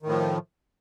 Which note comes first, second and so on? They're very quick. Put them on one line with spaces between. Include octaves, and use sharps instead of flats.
D#3 A2 F3